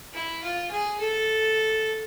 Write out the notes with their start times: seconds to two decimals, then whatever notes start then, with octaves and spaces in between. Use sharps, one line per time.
0.14 E4
0.44 F4
0.71 G#4
1.00 A4